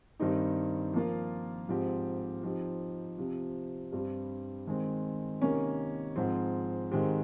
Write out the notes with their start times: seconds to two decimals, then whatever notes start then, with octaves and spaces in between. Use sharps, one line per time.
0.20 G2 D#3 G3 C4 D#4
0.94 F3 A#3 F4
1.69 G#2 F3 C4 G4
2.43 F3 C4 D#4 G4
3.18 C3 F3 C4
3.92 G2 G3 C4
4.67 D#3 G#3 C4
5.41 C3 D#3 A#3 C#4
6.16 G#2 F3 C4
6.91 G#2 D#3 G#3 C4 G4